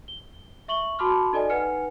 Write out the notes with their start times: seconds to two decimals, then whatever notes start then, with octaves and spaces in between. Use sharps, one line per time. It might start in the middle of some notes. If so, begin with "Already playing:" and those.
0.08 G7
0.68 E5 C#6 F#7 G7
0.99 F#4 A5 B5 C6 D6 F6
1.33 D#4 A4 D5 D#5 G#5
1.50 D#4 B4 F#5 G#5 F6 C#7